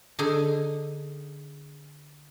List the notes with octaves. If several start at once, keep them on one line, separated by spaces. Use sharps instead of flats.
D3 D#4 G#4